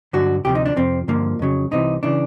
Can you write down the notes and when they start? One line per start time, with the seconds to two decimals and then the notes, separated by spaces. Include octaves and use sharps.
0.13 G2 D3 F#3 F#4
0.44 D2 C3 F3 G4
0.55 D#4
0.66 D4
0.76 F2 C3 F3 C4
1.08 G2 D3 F3 A#3
1.39 F2 C#3 F#3
1.71 C2 C3 E3 D#4
2.03 C#3 E3 D4